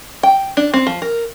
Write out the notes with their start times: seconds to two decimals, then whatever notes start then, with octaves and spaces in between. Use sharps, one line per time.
0.23 G5
0.57 D4
0.74 C4
0.87 F3
1.02 A#4